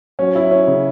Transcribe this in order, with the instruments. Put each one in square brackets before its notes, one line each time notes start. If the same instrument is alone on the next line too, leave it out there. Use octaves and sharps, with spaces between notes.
[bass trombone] F#3 [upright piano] C#4
[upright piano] E4
C#4
C#3